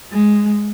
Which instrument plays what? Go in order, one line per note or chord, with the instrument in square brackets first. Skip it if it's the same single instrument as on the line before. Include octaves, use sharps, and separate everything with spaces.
[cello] G#3